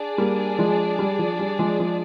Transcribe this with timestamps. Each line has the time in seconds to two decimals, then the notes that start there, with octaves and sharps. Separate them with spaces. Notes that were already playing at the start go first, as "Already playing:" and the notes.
Already playing: D4 G#4 D5
0.18 G3 A#3
0.59 F3 G#3
0.99 G3
1.19 F3
1.39 G3
1.59 F3 G#3
1.79 F3 G#3